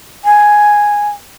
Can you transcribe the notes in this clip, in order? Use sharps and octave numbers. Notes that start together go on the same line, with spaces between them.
G#5